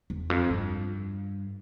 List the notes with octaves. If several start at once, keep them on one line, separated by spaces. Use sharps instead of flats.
E2
F2
G2